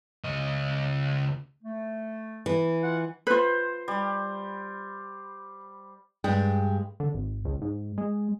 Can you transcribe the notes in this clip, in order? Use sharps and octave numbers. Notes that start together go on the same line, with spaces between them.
C#2 D#5
A3
E3
F4 F#5
F4 B4 C5
G3
G2 G#3 G5
D3
G#1
C#2
G#2
G#3